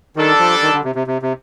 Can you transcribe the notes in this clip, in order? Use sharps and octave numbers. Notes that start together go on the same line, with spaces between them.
D#3 G3 D4 A4
F3
D#3
D3
C3
C3
C3
C3